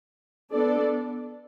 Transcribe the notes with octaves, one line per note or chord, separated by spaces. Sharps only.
B3 D4 A4 D5